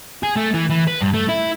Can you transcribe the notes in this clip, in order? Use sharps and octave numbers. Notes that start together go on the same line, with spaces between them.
G#4
A3
E3
E3
B4
G2
A3
E4